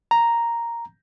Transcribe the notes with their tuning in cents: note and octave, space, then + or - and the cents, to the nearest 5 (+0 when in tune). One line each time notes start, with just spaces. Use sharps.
A#5 +0